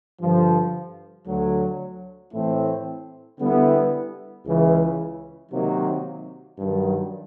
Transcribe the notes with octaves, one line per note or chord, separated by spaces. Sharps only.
G2 D3 F3
D2 D3 F#3
A2 E3 A3 C4 E4
D3 G3 B3 E4
C#2 C#3 E3
C3 D#3 F#3 A#3 D#4
G2 D#3 F#3